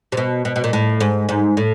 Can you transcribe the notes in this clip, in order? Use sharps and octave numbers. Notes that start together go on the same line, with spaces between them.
C3
B2
B2
B2
A#2
A2
G#2
G#2
A2